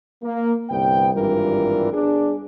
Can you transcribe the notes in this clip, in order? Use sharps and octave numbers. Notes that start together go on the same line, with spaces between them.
A#3
G1 C2 B3 G5
G#1 G2 E3 G3 F4 A#4
G1 D4 G#4